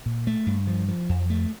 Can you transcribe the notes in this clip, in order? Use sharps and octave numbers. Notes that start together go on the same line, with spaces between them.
A#2
A3
G2
F3
F3
F2
A3